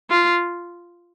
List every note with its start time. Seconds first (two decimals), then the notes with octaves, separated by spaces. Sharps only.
0.10 F4